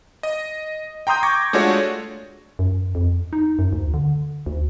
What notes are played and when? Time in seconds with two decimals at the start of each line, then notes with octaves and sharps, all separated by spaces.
0.23 D#5
1.07 G5 A#5 C6 D#6 G6
1.23 C#6 D6 G#6 A#6
1.53 G#3 A3 D4 F4 F#4 C#5
2.59 F#2
2.95 F2
3.33 D#4
3.59 F#2
3.73 D2
3.94 D3
4.46 D2